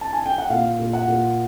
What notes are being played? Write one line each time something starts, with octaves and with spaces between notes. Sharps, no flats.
A5
G#5
G5
F#5
A#2 F5
A#2
F#5
A#2